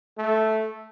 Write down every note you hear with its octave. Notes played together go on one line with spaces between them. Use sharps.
A3